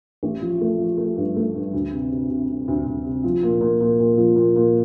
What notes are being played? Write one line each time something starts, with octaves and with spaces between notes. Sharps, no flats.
A1
F3
A3
F3
A3
G2
A3
G2
D2
C3
C3
C3
C3
D2
D2
C3
F3
A#2
A#2
A#2
A#2
F3
A#2
A#2